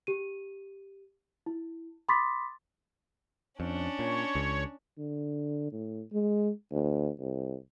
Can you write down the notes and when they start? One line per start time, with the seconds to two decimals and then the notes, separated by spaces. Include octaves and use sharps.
0.07 G4 D#7
1.46 E4
2.09 B5 C6 D6 D#6 A6 B6
3.60 F2 C#4 D4
3.99 A#2 C#5
4.35 C#2
4.98 D3
5.72 A2
6.13 G#3
6.71 D2
7.19 C2